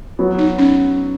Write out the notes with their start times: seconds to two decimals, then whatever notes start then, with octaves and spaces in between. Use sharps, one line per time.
0.19 F#3 B3 F#4
0.38 D#4
0.58 C#4